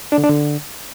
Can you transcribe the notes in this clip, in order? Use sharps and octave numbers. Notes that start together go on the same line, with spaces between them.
D4
D3
D4
D3